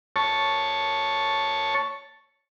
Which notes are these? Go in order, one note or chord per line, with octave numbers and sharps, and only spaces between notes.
C#5 A5